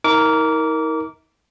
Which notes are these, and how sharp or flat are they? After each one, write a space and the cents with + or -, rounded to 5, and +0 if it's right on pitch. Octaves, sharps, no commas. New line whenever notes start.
D#4 +45 A#4 +0 D6 -25